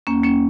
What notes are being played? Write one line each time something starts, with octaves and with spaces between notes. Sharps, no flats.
E2 A#3 C#4
A#3 C#4